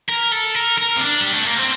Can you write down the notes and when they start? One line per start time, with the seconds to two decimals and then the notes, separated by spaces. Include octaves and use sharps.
0.09 A#4
0.31 A4
0.55 A#4
0.78 A#4
0.97 C4
1.01 D4
1.21 G3
1.33 A3
1.46 A#3
1.58 C4